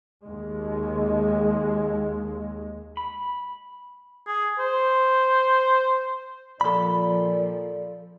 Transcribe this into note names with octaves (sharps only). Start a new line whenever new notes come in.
D#2 G#3
B5
G#4
C5
A#2 F3 A4 D5 B5